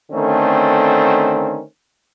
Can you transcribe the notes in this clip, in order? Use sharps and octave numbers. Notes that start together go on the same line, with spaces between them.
D3 D#3 A3 C4 C#4